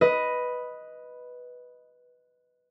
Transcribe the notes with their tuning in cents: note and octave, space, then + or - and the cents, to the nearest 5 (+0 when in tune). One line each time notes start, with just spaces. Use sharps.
B4 +0 D#5 +5